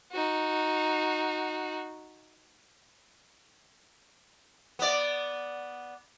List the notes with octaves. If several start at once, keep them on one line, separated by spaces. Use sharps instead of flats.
D#4 F#4
B3 D5